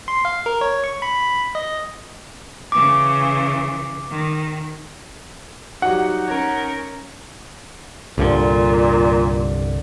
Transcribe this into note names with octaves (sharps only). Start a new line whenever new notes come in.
C6
F5
A#4
C#5
C#6
B5
D#5
C#3 E3 D6
D#3
G2 F#3 D#4 F#4 F#5
C#4 A#4 C#5
C2 G2 A#2 D3